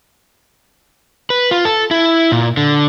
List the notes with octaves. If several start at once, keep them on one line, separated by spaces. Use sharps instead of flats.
B4
F4
A4
E4
A#2
D3